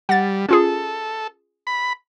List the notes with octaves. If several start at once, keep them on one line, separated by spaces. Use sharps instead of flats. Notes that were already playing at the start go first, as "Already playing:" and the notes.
G3 F#5 A6
C#4 F4 G#4 A4
B5